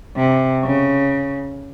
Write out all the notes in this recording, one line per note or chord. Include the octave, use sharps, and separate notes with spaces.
C3
C#3